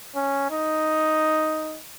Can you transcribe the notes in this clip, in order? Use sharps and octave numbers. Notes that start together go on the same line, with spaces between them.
C#4
D#4